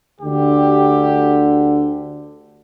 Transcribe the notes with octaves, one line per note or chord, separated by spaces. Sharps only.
D2 D3 G4